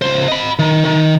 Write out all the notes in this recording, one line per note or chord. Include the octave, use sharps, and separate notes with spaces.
C#2 C5
D#5 B5
D#3
D#3